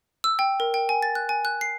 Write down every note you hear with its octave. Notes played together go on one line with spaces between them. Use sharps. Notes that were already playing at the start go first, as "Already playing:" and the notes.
E6
G5
A#4
G5
G#5
A6
F#6
G#5
F#6
C7